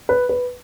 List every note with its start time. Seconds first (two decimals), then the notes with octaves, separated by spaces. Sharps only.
0.09 B4
0.29 B4